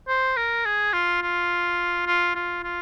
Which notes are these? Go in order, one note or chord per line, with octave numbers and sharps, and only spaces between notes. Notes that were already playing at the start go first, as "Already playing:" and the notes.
C5
A#4
G#4
F4
F4
F4
F4
F4